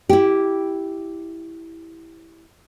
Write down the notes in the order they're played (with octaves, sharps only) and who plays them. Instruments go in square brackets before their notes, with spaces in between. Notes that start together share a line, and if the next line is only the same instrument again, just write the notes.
[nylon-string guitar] E4 G4